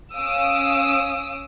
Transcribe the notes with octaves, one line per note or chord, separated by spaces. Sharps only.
C#4 F5 D#6 E6 D7